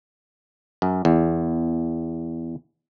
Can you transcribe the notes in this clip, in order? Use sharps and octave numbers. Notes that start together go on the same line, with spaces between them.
F#2
E2